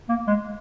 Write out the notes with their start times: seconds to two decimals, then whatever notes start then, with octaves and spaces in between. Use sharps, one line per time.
0.09 A#3
0.28 G#3